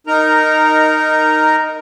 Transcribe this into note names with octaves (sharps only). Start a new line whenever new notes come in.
D#4 A#4 A#5